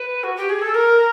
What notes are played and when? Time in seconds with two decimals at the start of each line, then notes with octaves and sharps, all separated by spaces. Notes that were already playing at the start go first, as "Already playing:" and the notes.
Already playing: B4
0.23 F#4
0.36 G4
0.49 G#4
0.61 A4
0.74 A#4